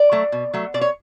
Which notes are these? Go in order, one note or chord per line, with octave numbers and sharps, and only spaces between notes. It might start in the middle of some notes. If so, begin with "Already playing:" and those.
Already playing: D5
F#3 A3
B2
F#3 A3
B2 D5
C#5